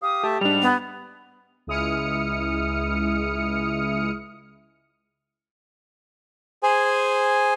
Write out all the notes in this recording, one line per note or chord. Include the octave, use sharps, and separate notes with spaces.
G4 F5 D#6
A3 G4 E5 A5
G#2 G3 D4 F7
B3
C#2 G#3 E4 D#6 F6 C#7
G#4 C5 G#5